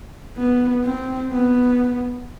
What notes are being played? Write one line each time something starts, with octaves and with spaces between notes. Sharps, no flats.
B3
C4
B3